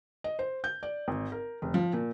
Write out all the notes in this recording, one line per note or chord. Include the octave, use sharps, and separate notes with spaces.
D#5
C5
G6
D5
G#1
A#4
F1
F3
A#2